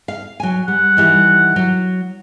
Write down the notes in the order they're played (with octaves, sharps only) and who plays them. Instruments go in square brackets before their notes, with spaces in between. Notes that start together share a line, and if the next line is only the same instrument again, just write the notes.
[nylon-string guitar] F5
F#3 G#5
[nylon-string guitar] G3 [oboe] F#5
[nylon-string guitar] D#3 E3 G3
F#3